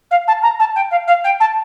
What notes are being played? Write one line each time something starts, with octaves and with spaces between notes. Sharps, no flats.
F5
A5
A#5
A5
G5
F5
F5
G5
A5